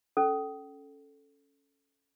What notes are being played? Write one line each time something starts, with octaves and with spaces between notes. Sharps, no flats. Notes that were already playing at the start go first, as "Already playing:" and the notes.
C#4 A4